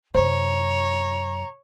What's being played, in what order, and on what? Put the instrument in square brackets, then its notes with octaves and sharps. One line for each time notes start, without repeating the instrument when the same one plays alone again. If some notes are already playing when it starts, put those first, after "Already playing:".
[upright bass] F#2 C3 [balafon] C5 [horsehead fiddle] C#5 [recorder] A#5